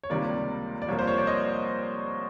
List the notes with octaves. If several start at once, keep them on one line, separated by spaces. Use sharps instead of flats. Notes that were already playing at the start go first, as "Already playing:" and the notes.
C#5
C#2 C3 D#3 G3 A#3 D5
D5
C2 C3 F3 A#3 C#5
C5
C#5
D5
D#5